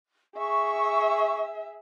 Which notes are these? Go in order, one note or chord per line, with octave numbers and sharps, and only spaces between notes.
G#4 E5 C#6